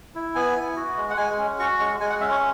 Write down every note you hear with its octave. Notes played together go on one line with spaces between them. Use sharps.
E4
B3 G#5
E4
F#4
G#3
F#5
G#3 G#5
C#4
F#4 C#6
G#3 C#6
G#3 G#5
F#5
C#4 E5
C#5